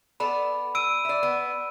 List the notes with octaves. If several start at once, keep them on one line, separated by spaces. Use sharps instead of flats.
B3 A4 D5 B5
E6 D7 D#7
D5 E5
B3